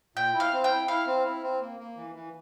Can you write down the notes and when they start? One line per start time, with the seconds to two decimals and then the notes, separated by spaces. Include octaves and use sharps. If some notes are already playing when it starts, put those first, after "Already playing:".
0.16 A#2 G5
0.34 E4
0.40 F5
0.53 C4
0.64 G5
0.70 E4
0.88 E4 F5
1.07 C4
1.25 E4
1.43 C4
1.60 A#3
1.79 A#3
1.97 E3
2.15 E3